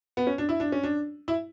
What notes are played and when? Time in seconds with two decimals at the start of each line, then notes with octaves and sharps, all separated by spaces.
0.17 B3
0.27 C#4
0.38 D4
0.49 E4
0.60 D4
0.72 C#4
0.83 D4
1.28 E4